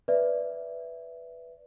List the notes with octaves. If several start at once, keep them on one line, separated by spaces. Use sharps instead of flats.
B4 D5 E5